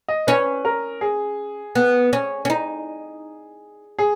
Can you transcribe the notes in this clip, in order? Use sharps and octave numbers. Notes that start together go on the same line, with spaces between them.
D#5
C#4 B4
A#4
G#4
B3
C#4
C#4
D#4
G#4